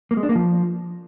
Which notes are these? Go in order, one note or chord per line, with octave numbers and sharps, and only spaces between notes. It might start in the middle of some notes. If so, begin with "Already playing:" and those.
A#3
G#3
D4
A#3
F3